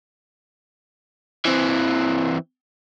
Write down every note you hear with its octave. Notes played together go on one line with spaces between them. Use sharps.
E3 C4